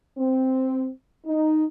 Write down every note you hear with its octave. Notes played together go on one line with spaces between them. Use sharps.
C4
D#4